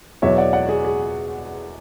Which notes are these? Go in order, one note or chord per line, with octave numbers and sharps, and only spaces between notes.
E2 B2 F#3 C#5 E5
D5 F#5
D5 F#5
G#4
G#4